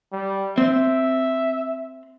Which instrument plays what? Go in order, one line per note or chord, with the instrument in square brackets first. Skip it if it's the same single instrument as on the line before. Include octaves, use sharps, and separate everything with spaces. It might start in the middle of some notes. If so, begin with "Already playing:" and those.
[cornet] G3
[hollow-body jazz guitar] C4 [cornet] E5